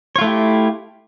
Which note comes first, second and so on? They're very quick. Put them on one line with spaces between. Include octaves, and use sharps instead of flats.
C#5 F4 A3 E4 G4